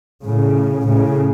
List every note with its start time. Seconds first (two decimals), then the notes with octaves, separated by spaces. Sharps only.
0.23 A2 C#3
0.86 A2 C#3